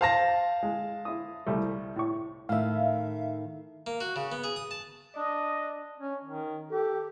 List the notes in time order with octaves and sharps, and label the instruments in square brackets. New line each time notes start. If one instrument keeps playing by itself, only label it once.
[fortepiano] C5 [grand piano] F5 A5 A#6
[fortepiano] G#3
E4 D#6
C2 G3 A3
A2 C#6
[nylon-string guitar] A2 D#3 [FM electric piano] E5 F5
[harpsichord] A#3
F#4
C#3
B3
G#4
D#6
A5
[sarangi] D4 [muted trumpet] D#5
[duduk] C#4
D#3
[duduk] G4 [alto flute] A4